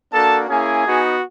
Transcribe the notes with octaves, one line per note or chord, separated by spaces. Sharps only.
A#3 D4 F#4 A4 A5
A#3 C#4 E4 G#4 G#5
B3 D#4 F#4